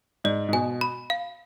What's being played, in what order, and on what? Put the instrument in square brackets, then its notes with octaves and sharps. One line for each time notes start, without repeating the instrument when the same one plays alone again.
[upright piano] G#2 [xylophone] D5
[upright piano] G#2
[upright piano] B2 [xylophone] G#5
[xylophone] B5
F5